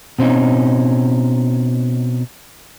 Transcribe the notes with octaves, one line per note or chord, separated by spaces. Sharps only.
B2 C4 C#4 D#4